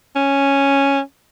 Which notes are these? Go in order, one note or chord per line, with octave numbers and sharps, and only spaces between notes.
C#4